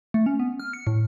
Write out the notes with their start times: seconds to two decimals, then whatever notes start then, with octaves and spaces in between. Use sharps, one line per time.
0.14 A3
0.26 C#4
0.40 B3
0.60 F6
0.73 C#7
0.87 A2